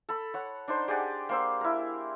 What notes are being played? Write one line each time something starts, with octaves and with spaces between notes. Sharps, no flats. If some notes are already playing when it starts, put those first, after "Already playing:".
A4 B5
C#5 F#5
D4 D#4 C5
G4 G#4 D5 F#5
A#3 C5 E6
E4 A#4